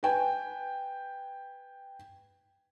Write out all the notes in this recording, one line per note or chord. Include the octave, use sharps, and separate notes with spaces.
B4 G5 G#5